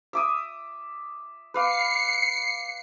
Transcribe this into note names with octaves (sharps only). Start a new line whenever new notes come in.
E5 D6 D#6
B4 F5 D6 C7 C#7